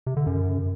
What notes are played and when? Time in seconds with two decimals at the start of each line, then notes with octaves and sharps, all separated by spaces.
0.07 C3
0.17 D3
0.26 F#2